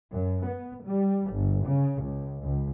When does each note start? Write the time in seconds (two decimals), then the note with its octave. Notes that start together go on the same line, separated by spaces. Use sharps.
0.12 F#2
0.46 B3
0.86 G3
1.33 G1
1.66 C#3
2.03 C#2
2.40 C#2